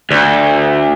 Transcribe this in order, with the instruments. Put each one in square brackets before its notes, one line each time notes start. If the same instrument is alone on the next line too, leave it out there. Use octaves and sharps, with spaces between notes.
[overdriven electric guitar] D2